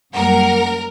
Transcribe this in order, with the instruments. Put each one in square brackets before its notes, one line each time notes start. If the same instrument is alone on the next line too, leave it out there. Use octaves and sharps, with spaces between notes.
[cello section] F#2 G3 A#3 [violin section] A#4 [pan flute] F#5